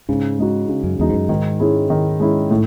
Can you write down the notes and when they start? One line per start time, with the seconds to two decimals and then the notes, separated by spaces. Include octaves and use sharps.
0.09 G#2 C#3
0.39 G#3 D#4 F#4
0.69 C#3
0.84 F#2
0.99 E2 G#3 D#4 F#4
1.10 G#2
1.14 F#2
1.29 G#2 D#3
1.60 G#3 C#4 E4 G#4
1.90 D#3
2.20 G#3 C#4 E4 G#4
2.51 A2